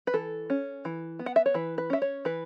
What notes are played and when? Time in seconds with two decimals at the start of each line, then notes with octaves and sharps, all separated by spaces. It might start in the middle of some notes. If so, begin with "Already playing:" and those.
0.07 B4
0.14 E3 A4
0.50 C#4
0.85 E3
1.19 B3
1.26 F#5
1.36 E5
1.46 C#5
1.54 E3 B4
1.78 B4
1.90 C#4 E5
2.02 C#5
2.25 E3 B4